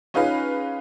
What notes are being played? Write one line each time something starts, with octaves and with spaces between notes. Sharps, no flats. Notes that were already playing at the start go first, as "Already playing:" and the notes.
C#4 D#4 F4 G#4 B4 F5